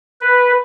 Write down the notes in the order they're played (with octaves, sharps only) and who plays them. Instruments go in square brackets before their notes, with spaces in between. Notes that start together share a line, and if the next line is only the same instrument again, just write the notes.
[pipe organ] B4